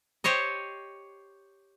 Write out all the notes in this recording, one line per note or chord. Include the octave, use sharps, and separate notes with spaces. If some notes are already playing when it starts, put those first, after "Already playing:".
G4 C5 C#5 D#5